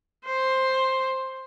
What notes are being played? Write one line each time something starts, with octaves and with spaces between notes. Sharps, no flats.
C5